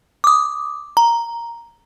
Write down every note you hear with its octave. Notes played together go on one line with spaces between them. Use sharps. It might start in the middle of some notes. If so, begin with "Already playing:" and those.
D6 D#6
A#5